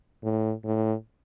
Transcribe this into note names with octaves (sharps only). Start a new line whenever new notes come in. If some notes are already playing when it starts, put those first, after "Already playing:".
A2
A2